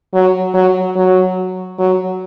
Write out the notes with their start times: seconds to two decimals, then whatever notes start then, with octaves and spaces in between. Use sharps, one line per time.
0.14 F#3
0.54 F#3
0.96 F#3
1.79 F#3